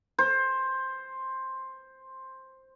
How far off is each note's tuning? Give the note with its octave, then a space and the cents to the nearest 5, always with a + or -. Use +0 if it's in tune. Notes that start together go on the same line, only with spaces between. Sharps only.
C5 +10